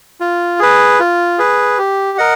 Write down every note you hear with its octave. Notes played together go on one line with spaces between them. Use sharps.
F4
G#4 B4
F4
G#4 B4
G4
A#4 D#5 F#5